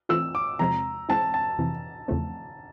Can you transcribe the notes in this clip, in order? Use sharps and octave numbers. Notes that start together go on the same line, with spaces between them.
E3 A3 C4 F4 E6
D6
E2 C3 F3 G#3 C4 A#5
E3 G#3 C4 A5
A5
F2 C3 E3
E2 C#3 F3 A3 C4